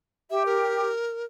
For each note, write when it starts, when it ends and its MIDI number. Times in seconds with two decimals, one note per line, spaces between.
0.30 0.89 67
0.30 0.43 76
0.46 1.25 70